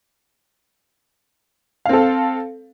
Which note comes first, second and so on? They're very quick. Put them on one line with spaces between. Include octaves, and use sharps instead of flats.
F5 C4 A4